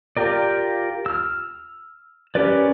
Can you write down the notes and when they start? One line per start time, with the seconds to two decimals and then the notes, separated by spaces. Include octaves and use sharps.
0.17 F4 G4 A#4 D5
1.06 E6 F6
2.35 C#4 G4 A#4 B4 D5